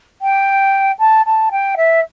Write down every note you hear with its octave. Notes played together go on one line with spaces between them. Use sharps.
G5
A5
A5
G5
E5